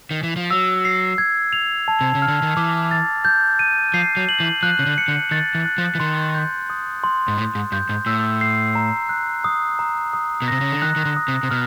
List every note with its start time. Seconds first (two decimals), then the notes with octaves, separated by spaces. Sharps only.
0.11 D#3
0.23 E3
0.36 F3
0.51 F#3 E6
0.85 C7
1.18 G#6
1.53 F7
1.88 A5
2.01 C3
2.15 C#3
2.22 F6
2.28 D3
2.42 D#3
2.57 E3 D6
2.91 A6
3.25 G6
3.59 D#7
3.94 F3 C7
4.17 F#3
4.29 F#7
4.40 E3
4.63 F3 F#6
4.79 C#3
4.86 D3
4.98 C#7
5.08 D3
5.31 D#3 A6
5.55 E3
5.65 F#6
5.78 F3
5.95 E3
6.00 D#3 C6
6.34 G6
6.70 D#6
7.04 C6
7.28 G#2
7.38 A2 C6
7.55 G#2
7.72 G2 G6
7.89 G#2
8.06 A2 E6
8.41 C7
8.75 A#5
9.09 F#6
9.44 D#6
9.79 A#5
10.13 D#6
10.42 B2
10.48 C3 A#6
10.61 C#3
10.72 D3
10.82 D#3 F#6
10.96 D#3
11.05 D3
11.17 D#6
11.28 C3
11.43 C3
11.51 B2 F6